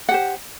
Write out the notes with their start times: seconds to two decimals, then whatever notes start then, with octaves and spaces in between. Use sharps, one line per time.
0.09 F#5
0.11 G4
0.14 C5